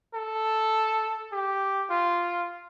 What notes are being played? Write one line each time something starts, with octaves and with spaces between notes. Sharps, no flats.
A4
G4
F4